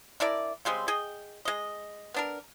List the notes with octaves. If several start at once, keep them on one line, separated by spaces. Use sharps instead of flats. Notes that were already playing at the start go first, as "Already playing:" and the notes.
D4 E4 A#4 D5
C#3 G3 G#3 C4
G#4 D#5 G5
G#3 D#5
B3 D4 A#4